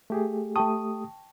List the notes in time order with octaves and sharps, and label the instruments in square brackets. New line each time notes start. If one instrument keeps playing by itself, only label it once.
[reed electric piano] A3 G4 G#4
[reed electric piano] A3 G4 D#6 [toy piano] G5 A5 C#6